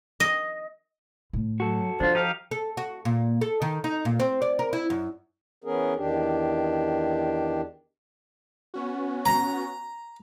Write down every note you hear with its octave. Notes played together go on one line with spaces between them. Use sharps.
D#5
A2
F#3 F#4 A4
F3 D4 F4 C5
D#4 G4 F5
A4
F#4
A#2
A4
D#3
D#4
A#2
C4
D5
A#4
E4
F#2
E3 B3 C#4 G#4 A#4
E2 D#3 D4 G4
B3 C#4 F#4
A#5